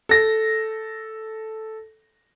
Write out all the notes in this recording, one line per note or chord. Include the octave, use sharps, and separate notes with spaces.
A4 A#6